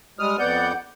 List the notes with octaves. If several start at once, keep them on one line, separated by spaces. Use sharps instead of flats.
G3 G#3 D#6 F6
F2 B3 D5 F#5 G6